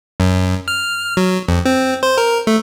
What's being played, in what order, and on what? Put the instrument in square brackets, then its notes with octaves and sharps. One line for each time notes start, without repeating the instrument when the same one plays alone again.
[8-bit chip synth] F#2
F6
F#3
F2
C4
C5
A#4
A3